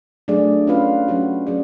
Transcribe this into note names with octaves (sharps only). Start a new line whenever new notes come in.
F#3 A3 D4 G#4 D5
C#4 F4 B4 F5
F#3 C#4 F#4
F#3 C#4 G#4 D5